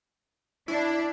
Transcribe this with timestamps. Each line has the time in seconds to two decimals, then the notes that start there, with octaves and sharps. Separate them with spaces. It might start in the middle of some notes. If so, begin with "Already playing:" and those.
0.68 D4 E4